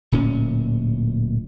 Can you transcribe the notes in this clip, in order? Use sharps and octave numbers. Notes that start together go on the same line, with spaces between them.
D1 A#2 C#4